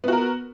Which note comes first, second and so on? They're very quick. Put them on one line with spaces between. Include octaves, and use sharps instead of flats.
B3 F#4 A#4